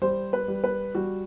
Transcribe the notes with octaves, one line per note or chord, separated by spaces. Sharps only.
G3 C5
B4
G3
B4
G3 F#4